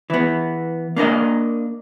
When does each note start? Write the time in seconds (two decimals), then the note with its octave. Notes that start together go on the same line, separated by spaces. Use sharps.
0.10 E3 B3
0.96 A#3 D4 A#4 D#5